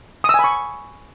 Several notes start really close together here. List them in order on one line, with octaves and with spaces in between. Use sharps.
D#6 E6 G#5 B5 C#6